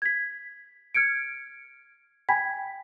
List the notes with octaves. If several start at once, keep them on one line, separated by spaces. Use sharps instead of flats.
G#6 B6
F6 G#6 C#7 D7
G5 G#5 B5 G#6 B6